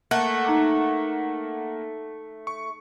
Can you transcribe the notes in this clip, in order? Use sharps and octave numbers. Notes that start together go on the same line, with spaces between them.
A3 A#3 F#5 F#6
D#4 A#5 D6
C#6